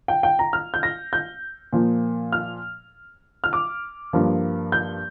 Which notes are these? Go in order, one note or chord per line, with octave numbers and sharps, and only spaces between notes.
G5
G5
A#5
F6
G6
A#6
G6
A#2 F3 A#3
F6
F6
D6
G2 F3 A#3
G6